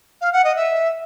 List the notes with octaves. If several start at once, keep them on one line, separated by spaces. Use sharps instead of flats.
F5
F#5
D#5
E5